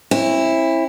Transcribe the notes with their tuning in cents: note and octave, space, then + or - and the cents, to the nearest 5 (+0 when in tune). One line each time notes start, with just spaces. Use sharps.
C4 +45 E4 +0